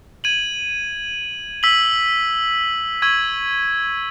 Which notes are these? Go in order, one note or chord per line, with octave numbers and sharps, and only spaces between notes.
G#6 D#7 F#7
E6 B6 F#7
C#6 E6 G#6 D#7 F#7